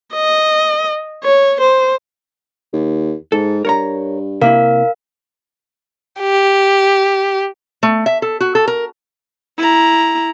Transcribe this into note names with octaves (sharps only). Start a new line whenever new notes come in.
D#5
C#5
C5
D#2
G#2 A4
G2 A#4 C#5 A#5
C3 A#3 E4 A#4 F5
G4
A3
E5
A4
F#4
A4
A#4
E4 A#5